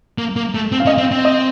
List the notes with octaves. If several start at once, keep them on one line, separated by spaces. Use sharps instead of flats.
A#3
A#3
A3
C4
F5
C#4 D#5
C4 F5
C4
D#5